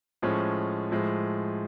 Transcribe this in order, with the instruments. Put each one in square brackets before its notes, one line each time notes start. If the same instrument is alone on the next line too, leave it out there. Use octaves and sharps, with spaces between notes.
[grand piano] A2 F3 G#3 C#4
A2 F3 G#3